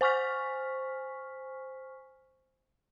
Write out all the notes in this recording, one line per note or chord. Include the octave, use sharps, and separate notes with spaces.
C5 G#5 C#6 F6 B6